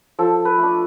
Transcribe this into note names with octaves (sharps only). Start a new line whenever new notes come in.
F3 A4
B4
A3 D4